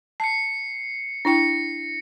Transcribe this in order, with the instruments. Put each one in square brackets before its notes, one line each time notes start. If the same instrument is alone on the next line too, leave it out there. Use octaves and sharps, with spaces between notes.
[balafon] A5 [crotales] C7 C#7
[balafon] D4 E4 G5 [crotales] A#6 C#7